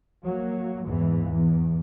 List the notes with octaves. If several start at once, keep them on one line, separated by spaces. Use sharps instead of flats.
F#3 A#3
E2 G#2 E3
E2